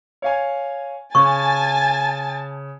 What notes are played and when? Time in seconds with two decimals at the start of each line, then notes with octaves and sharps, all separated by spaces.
0.22 C#5 F5 G#5
1.15 C#3 G#5 A5 C#6 A6